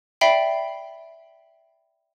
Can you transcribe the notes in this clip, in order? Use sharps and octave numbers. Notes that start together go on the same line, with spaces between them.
D5 E5 G5 B5 C7 G7